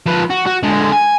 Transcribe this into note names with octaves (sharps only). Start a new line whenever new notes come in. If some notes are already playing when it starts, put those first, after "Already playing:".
F3 B4
F#4
F#4
D3 G#3
G#5